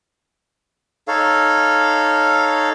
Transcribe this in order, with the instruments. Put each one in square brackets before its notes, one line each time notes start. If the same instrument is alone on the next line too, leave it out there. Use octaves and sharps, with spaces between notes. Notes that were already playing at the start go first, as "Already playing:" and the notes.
[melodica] D#4 A4 C#5 F5